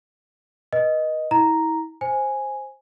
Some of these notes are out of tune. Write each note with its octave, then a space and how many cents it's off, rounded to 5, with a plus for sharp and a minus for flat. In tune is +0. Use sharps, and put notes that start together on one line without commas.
B4 -35 D#5 +0
E4 -35 A#5 +0
C5 +10 G#5 +0